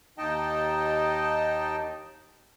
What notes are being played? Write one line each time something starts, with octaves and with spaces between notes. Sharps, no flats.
D#2 D#4 D#5 G5 A5